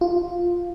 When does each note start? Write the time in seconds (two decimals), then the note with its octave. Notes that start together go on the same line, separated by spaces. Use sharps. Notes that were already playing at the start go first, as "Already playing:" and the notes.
0.01 F4